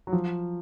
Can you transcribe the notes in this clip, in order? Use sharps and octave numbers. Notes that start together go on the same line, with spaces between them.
F#3
F3